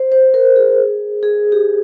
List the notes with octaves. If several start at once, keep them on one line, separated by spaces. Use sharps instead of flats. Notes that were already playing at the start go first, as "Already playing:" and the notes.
Already playing: C5
C5
A#4
G#4
G#4
G4